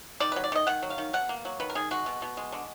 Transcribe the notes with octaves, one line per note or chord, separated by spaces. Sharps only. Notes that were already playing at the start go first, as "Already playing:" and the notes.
D#3 D5
F#3 B4
D5
D#3 D#5
D#3 F#5
F#3
F5
D#3
B2 F#5
A#3
F#3
D#3 B4
A#4
D#3 G#4
G#3 F#4
B2
B2
G#3
D3